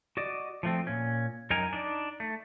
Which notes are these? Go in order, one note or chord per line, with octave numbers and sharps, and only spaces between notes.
F#4 D5 D#5
F3 A3 C4
A#2 C#4
F#2 D#4 A#4 G#5
D4 D#4 D5
A3